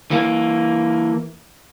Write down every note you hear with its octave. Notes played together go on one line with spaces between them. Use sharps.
E3 A#3